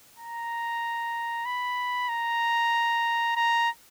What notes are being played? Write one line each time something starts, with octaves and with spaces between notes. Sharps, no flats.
A#5
B5
A#5
A#5